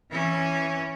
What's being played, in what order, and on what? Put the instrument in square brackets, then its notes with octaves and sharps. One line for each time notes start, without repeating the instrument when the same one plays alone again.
[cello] E3 C#4